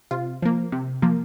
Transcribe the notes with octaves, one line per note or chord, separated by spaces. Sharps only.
C3 F4
F3 A#3
C3
F3 A#3